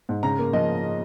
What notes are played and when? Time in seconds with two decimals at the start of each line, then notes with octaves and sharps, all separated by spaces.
0.09 G#2
0.23 C#3 A#5
0.38 A#3
0.53 F3 D#5